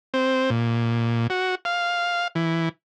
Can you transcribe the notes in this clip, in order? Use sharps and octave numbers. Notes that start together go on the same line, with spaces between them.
C4
A#2
F#4
F5
E3